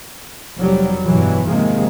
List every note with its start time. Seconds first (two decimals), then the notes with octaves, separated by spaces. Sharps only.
0.58 F1 F#3 G3
1.05 G2 B2 E3 F#3
1.45 G#2 C3 D#3 F3 G#3 A#3